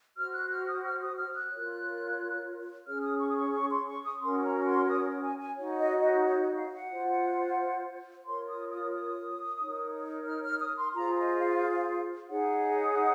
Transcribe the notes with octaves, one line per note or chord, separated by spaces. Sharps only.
F#4 C5 F6
F#6
F6
D#6
F6
D#6
F6
F#6
F4 A#4 C#5
C#4 G#4 C#5 F6
D#6
C#6
D#6
C#6
C#6
C6
C#6
D#6
C#4 F#4 A#4 C#5 C6
A#5
C6
D#6
G#5
G#5
D#4 F#4 C#5
D#5
D#5
C#5
D#5
F5
F#5
F4 C5
F4 A#4 C#5 C6
D#6
D#6
D#6
D#4 A#4 C#5
F6
F6
D#6
C6
F4 G#4 C5 A#5
D#5
F5
D#4 G#4 C#5 F#5